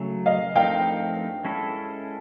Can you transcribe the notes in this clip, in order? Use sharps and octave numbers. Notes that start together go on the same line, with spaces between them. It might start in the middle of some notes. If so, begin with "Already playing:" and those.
Already playing: C#3 F#3 A3
D#5 F5
F3 A3 C4 D#4 F5 G5
G#3 C#4 E4 A4